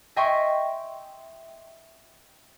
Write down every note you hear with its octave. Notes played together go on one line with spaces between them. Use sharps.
D#5 E5 G5 G#5 C6 C#6